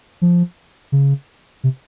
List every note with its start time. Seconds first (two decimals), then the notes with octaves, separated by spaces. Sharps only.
0.22 F3
0.92 C#3
1.64 C3